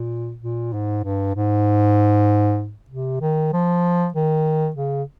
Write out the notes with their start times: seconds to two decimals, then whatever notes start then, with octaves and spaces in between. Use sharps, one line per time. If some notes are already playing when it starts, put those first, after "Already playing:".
Already playing: A#2
0.43 A#2
0.73 G#2
1.04 G2
1.35 G#2
2.90 C3
3.21 D#3
3.53 F3
4.14 D#3
4.76 C#3